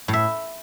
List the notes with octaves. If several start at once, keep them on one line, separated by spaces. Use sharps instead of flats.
A2
E5